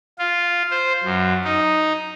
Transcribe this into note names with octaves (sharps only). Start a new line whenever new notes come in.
F4
C5
F#2
D#4